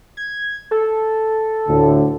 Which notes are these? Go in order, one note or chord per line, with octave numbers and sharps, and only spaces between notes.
G#6
A4
D2 A2 D3